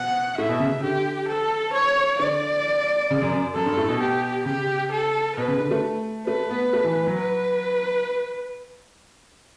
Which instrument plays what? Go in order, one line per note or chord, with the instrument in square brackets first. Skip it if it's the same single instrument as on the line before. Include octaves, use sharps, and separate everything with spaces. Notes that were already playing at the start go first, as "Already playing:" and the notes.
Already playing: [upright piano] B2 [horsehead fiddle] F#5
[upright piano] A2 [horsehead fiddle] E5
[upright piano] B2
C#3
[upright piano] D3 [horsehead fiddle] G4
[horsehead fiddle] A4
C#5
[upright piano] D3 [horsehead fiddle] D5
[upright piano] C#3
F#2
F#2
[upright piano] F#2 [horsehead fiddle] A4
[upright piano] G2
A2
B2
[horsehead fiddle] G4
[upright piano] C#3 [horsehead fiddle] G4
[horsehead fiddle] A4
[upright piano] B2 [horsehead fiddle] B4
[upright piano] C#3
D3
A3
[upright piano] A3 [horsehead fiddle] B4
[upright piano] B3
A3
E3
E3
F#3
[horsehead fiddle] B4